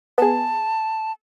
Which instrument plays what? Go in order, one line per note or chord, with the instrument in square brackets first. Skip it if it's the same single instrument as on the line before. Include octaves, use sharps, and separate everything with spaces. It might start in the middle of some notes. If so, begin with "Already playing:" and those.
[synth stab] B3 G#4 [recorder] A5